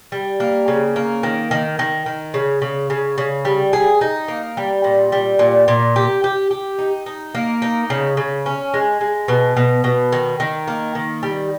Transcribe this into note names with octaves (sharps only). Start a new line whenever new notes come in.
G3
A#3
C#3
A#3
D#3
D#3
D#3
D#3
C#3
C#3
C#3
C#3
G3
G#4
D#4
A#3
G3
A#2
G3
A#2
A#2
G4
G4
G4
D#4
D#4
A#3
D#4
C#3
C#3
C#4
G#3
G#3
B2
B2
B2
D#3
D#3
A#3
D#3
G3